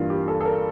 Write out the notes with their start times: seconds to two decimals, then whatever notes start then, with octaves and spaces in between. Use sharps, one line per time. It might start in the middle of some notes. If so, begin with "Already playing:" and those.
Already playing: G2 E3 A#3 F4
0.10 G4
0.28 A4
0.41 A4
0.45 A#4